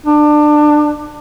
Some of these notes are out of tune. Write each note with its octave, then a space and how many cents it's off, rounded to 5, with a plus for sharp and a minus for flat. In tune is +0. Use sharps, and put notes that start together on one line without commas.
D4 +25